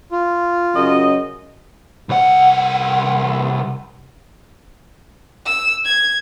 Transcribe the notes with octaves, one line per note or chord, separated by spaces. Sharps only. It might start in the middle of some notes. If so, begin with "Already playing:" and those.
F4
F#2 C#3 D#5
C2 F#5
E6
G#6